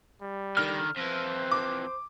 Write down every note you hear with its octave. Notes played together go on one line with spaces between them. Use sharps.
G3
D3 D#3 F6
F2 E3 C5
D6